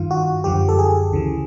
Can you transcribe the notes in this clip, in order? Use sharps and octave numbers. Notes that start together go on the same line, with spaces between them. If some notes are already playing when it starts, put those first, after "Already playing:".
Already playing: G2 D#3 F4
F#4
F#2 D3 F3 G4
A4
G#4
D2 C#3 E3